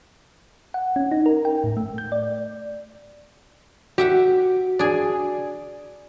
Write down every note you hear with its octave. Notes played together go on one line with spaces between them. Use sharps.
F#5
C#4
D#4
A#4
G5
A2
A3
G6
D5
F#4 G4 E5 F#5
D4 G#4